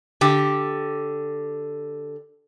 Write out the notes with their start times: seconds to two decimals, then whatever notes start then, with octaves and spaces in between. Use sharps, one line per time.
0.21 D3 G4